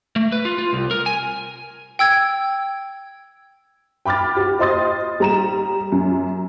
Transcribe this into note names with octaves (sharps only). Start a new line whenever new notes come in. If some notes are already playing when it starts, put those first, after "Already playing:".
A3
B4
F4
F4
C2
A#4
G#5
G5 E6 G#6
G5 B5 D6 F6 A6
F#4 G4
C5 D#5 C6 D#6 A6
G3 A#5 E7
F#2